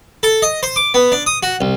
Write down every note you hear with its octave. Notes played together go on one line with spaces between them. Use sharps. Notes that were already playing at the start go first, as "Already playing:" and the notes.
A4
D#5
C5
D6
B3
D4
D#6
F#4
C2